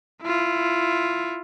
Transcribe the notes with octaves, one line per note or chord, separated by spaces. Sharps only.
E4 F4